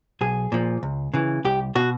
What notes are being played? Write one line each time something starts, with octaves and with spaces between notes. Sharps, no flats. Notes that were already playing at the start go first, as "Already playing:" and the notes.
B1 G#4
A#2 F3
C#2
C#3 E3
C2 G4
B2 F#4